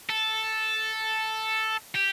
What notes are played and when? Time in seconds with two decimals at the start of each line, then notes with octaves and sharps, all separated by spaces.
0.10 A4
1.95 G4